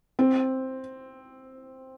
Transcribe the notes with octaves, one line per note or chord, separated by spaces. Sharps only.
C4